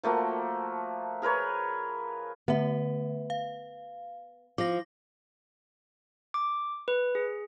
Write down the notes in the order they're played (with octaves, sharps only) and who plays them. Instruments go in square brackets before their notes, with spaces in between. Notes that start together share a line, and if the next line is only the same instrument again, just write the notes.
[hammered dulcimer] F3 A3 A#3 F#4
G#4 A#4 B4 C#5
[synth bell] D3 A3 E5 [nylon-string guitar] B3
[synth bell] F5
[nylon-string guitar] F3 [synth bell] D6 A#6
[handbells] D6
B4
G#4